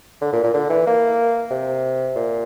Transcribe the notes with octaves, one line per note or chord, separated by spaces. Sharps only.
D3
A#2
A#2
D3
E3
A#3
C3
A#2